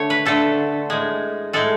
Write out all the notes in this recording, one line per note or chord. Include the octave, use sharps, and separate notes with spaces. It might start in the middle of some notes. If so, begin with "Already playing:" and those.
Already playing: D3 A3 C#5
B4
D3 A3 A4
A2 G#3
A2 G#3 A4